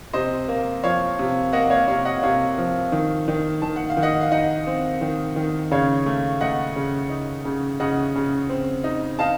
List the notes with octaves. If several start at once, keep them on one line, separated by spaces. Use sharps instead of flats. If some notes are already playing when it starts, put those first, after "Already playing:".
C3 C5 D#5
A#3
F3 C#5 F5
C3
A#3 D#5 F#5
C#5 F5
C3 C#5 F5
D#5 F#5
C3 C#5 F5
F3
D#3
D#3
D#3 A5
F#5
F5
D#3
D#5 F#5
F5
D#4 D#5 F#5
C4
D#3
D#3
C#3 C#5 F5
A3
A3 D#5 F#5
C#3
D#4
C#3
C#3 D#5 F#5
C#3
C4
D#4
D#4 F5 A5